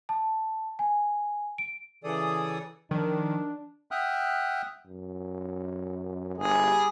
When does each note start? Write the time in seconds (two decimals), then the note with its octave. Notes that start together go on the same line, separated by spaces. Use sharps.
0.09 A5
0.79 G#5
1.58 D7
2.04 C#3 E3 G#4 A4 D5 D#6
2.91 D#3 F3 D4
3.91 E5 F#5 G5 D#6 F6 F#6
4.87 F#2
6.38 G1 G3 G#4